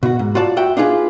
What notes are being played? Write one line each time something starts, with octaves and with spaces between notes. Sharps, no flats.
B2 F#4
G#2
F4 F#4 D5 A5
F#4 E5 G5
D4 D#4 F4 G#4 B4